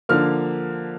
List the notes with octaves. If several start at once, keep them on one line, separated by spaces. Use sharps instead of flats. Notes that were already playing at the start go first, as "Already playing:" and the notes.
D3 F3 A#3 F6